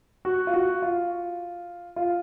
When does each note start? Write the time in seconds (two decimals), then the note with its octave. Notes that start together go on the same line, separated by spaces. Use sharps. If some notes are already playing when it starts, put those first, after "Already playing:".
0.25 F#4
0.47 F4
0.54 F#4
0.82 F4
1.96 F4